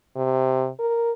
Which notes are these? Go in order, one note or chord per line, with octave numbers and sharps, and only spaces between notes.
C3
A#4